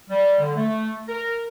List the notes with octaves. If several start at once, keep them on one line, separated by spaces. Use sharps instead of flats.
G3
D3
A3
A#4